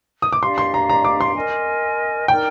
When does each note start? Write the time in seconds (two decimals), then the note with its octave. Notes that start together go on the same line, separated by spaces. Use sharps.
0.22 D#6
0.33 D6
0.42 D4 G4 D5 F5 C6
0.58 C6
0.74 A#5
0.89 A#5
1.05 D6
1.21 C6
1.35 A#4 D#5 G#5
2.28 D#4 A#4 D5 G5